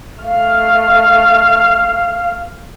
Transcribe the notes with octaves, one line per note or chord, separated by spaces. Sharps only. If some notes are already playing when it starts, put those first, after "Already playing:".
A3 F5 F6